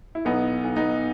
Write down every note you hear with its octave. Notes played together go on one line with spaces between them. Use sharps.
E4
B1 B3 D#4
B1
B3 D#4